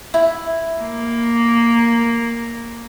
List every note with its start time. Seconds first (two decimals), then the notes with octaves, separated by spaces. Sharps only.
0.14 E4
0.81 A#3